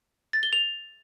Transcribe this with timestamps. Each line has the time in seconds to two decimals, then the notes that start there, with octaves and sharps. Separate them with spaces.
0.33 A6
0.43 G7
0.53 F7